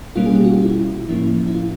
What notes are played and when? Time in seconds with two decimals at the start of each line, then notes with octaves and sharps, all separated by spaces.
0.16 B2 G3 A#3 C#4 F4
0.26 G#4
0.35 G4
0.44 F#4
0.53 F4
0.62 E4
1.09 A2 F3 A#3 C#4 E4
1.47 E4
1.54 F4